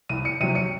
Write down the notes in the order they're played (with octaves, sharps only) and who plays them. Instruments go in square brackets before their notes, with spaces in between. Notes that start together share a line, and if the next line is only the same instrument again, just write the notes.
[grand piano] C2 [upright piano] D#7
[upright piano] C#7
[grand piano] C3 F#3 [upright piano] D#7
[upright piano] C#7